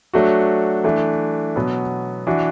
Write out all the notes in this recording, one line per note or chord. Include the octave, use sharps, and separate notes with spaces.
F#3 A3 D4 F#4
E3 A3 D4
B2 F#3 B3
E3 D4 F#4